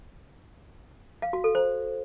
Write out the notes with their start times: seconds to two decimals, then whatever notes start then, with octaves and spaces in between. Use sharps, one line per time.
1.22 F5
1.33 F#4
1.44 A4
1.55 C5